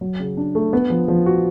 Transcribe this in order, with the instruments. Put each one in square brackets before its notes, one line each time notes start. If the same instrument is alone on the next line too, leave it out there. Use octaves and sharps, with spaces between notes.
[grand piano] F#3
C#3
D4
A3
B3
F3
F3
F#4